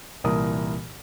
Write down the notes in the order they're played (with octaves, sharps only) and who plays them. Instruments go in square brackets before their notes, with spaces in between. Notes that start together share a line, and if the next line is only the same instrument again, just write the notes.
[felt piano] C2 A#2 E3 A#4 D#6